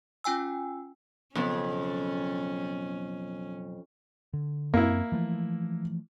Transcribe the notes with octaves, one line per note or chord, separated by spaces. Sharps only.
C#4 F4 G5 G#5 E6
B1 F2 C#3 B3 C#4
D3
F#2 A#3 C4 E4
E3 F3 A3